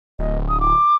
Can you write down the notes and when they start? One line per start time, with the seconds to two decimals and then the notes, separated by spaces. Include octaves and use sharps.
0.19 D1 D#5
0.48 D#6
0.60 D6